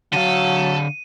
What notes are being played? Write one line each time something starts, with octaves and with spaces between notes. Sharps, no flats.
D3 F#3 A4 F5 D#7